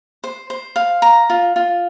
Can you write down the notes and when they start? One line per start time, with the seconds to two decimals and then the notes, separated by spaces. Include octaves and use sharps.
0.24 C5
0.50 C5
0.76 F5
1.02 A#5
1.30 F4
1.56 F4